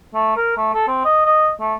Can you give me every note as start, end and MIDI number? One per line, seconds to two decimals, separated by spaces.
0.14 0.36 57
0.36 0.53 70
0.57 0.72 57
0.73 0.87 69
0.88 1.00 60
1.05 1.23 75
1.26 1.51 75
1.60 1.74 57